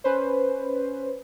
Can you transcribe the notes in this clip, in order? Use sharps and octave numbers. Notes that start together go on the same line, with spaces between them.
C#4 B4 C5